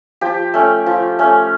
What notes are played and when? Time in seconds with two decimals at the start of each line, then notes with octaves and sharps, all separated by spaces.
0.21 F3 G4
0.54 A3 C#4
0.86 F3
1.19 A3 C#4